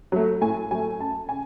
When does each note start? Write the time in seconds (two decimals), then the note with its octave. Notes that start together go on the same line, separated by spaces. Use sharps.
0.12 F#3 A3
0.41 A2 G#5
0.71 F#3 A3 G#5
1.00 F#2 A5
1.29 C#3 G#5